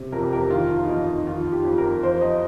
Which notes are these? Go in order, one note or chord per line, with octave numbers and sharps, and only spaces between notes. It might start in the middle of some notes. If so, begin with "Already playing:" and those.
Already playing: C3
F2 A#4
G4
A#4
D#3 F4
F4
D#4
F2 F4
D#4
D#3 F4
G4
F2
A#4
F3 C5
D#5